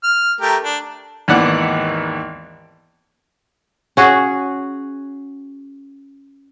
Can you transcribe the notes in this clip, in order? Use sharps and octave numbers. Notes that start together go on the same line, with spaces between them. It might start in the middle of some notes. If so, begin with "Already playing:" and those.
F6
A3 G4 A#4
D4
G#1 D#2 E3 B3 D5 F#5
C#4 F#4 G#4